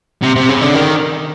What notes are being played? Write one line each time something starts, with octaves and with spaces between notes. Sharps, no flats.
C3
C3
C#3
D3
D#3